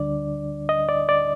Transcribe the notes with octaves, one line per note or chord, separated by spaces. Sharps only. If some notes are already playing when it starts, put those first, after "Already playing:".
Already playing: D2 D3 G3 D4 D5
D#5
D5
D5